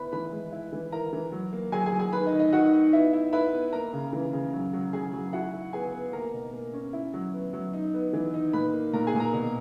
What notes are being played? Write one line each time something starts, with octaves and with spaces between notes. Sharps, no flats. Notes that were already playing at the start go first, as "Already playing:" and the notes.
Already playing: B3 E4 B4 B5
E3 B4 B5
G#3
E4
E3
E4 A#4 A#5
E3
F#3
A#3
F#3 G#4 G#5
G#4 G#5
F#3
G#4 G#5
D#3 B4 B5
D#4 D#5
D#3
D#4 D#5
D#3 F#4 F#5
D#4
B3 E4 E5
E4
E4 B4 B5
B3
A#3 A#4 A#5
C#3
E3
C#3
F#3
F#3
F#3 G#4 G#5
F#3
E4 F#4 F#5
E4
B3 G#4 G#5
B3
A#3 A#4 A#5
B2
A#3
C#4
E4
F#3
B3
F#3
D#4
B3
E3
D#4
A#2 B4 B5
A#3
A#2 A#4 A#5
G#4 G#5
A#2
A#4 A#5
B2